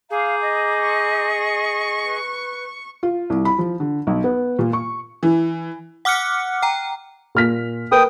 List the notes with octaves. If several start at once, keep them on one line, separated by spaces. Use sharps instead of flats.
G#4 F5 A#5 D6 G6
D#5
C#6
B4
F4
C2
B5
F3
D3
B1
B3
A#2
C#6
E3
F#5 D6 F6 F#6 C#7
G5 A#5
A#2 F6 B6
A#4 B4 G5 D#6